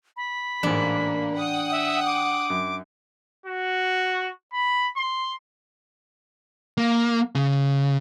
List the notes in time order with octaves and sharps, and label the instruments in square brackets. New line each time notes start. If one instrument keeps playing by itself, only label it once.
[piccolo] B5
[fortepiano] A1 G#2 [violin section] A#3 [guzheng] D4
[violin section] F#5 G5 D#6
[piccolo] E5
D6
[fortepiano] F#2
[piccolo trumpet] F#4
B5
C6
[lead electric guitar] A#3
C#3